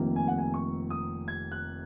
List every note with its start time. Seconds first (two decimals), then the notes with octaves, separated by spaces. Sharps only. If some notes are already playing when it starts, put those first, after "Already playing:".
Already playing: F1 F2 C3 D#3 A#3
0.16 G#5
0.28 F#5
0.38 G#5
0.54 C#6
0.90 D#6
1.28 G#6
1.52 F#6